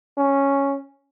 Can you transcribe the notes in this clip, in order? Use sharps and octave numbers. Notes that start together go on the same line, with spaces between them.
C#4